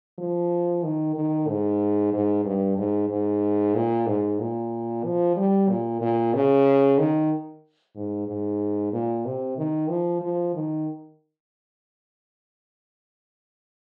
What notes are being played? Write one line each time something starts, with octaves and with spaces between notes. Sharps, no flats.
F3
D#3
D#3
G#2
G#2
G2
G#2
G#2
A#2
G#2
A#2
F3
G3
A#2
A#2
C#3
D#3
G#2
G#2
A#2
C3
D#3
F3
F3
D#3